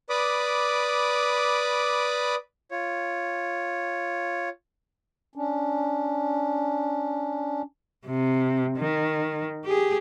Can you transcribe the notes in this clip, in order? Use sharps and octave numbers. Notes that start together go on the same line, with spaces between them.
B4 D5 B5 D6 D#6
F4 C#5
C#4 D4
C3
D#3
G4 G#4